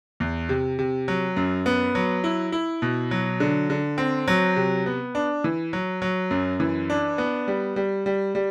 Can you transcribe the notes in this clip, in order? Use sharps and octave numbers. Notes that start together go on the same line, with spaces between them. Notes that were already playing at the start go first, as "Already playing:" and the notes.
E2
C3
C3
F#3
F#2
B3
F#3
E4
E4
B2
F#3
D3
D3
C4
F#3
C3
B3
D4
E3
F#3
F#3
F#2
E3
D4
B3
G3
G3
G3
G3